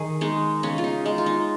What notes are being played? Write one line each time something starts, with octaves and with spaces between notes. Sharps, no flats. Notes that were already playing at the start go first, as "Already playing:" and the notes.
Already playing: D#3 G#4
G#3 D#4
C#3 C#4
F4
D#4
G#3 D#4
F4
D#4